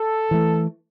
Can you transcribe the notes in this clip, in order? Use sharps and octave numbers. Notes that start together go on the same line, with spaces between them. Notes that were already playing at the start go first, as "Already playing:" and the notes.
Already playing: A4
E3 A3